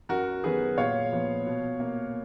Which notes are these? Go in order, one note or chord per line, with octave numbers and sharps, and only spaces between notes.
F#2 F#4 A#4
D#3 F#3 B3 G#4 B4
A#2 C#5 F5
F3 B3
B2
A#3